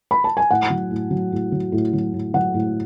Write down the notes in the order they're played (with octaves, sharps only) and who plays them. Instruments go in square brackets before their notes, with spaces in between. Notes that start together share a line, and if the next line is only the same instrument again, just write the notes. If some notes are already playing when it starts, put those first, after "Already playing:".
[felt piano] B5
A5
G#5
A2 F#5
F#3
A2
F#3
A2
F#3
A2
F#3
A2
F#3 F#5
A2